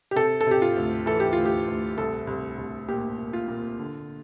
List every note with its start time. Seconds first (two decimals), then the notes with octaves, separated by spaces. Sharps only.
0.11 G4
0.16 C3 A4
0.41 A4
0.47 C3 G4
0.62 F4
0.76 D2
1.06 E3 A4
1.20 G4
1.33 D2 F4
1.45 G4
1.67 D2
1.97 C2 A4
2.27 C2
2.58 C2
2.89 A#2 G4
3.18 A#2
3.33 F4
3.48 A#2
3.79 D3